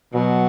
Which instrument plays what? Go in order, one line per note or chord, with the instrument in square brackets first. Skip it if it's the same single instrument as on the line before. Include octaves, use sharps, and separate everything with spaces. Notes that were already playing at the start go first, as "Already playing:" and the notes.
[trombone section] B2 [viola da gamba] F#3